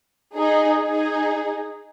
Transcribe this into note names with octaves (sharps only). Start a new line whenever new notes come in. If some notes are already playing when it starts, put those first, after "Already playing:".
D#4 G#4
D#4 G#4